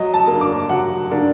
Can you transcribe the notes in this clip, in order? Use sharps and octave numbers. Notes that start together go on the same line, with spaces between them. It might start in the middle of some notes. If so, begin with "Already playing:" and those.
Already playing: F#3 D#5
A5
A#3 D4
D6
F#3 F#5
A#3 D4